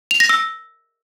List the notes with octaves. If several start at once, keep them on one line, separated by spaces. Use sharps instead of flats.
F7
A#6
E6